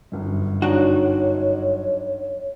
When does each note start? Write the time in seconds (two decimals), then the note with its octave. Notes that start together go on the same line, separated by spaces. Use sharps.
0.12 G1 F#2
0.62 D4 D#4 F#4 C#5